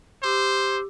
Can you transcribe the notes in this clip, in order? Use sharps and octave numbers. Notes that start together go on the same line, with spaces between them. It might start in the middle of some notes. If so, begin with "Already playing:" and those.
G4 C5 D6 E6